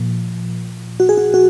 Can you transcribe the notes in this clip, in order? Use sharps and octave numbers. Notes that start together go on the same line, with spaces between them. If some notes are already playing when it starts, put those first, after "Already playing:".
Already playing: A#2 F3
F#4
G#4
F#4
F#4